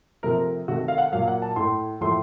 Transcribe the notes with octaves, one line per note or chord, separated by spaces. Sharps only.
C3 F3 A3 A#4
C3 D#3 A3 F#4
F5
F#5
A#2 F#3 A#3 F5
F#5
A5
A2 A3 C6
A2 F3 A3 C6